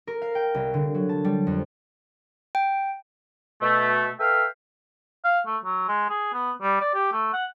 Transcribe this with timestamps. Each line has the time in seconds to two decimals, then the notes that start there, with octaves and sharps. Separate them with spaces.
0.07 A#4
0.22 F5
0.35 G5
0.55 C2
0.74 D3
0.95 F#3
1.09 A5
1.24 G3
1.47 F2
2.55 G5
3.62 B2 A3
4.19 A4 B4 E5 F5 G5
5.25 F5
5.46 A3
5.65 F#3
5.88 G#3
6.10 G#4
6.33 B3
6.62 G3
6.81 D5
6.94 G4
7.13 A3
7.33 F#5